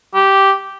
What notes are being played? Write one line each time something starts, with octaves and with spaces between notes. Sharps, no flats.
G4